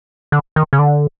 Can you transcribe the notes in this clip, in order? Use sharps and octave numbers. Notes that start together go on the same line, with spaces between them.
D3
D#3
C#3
D3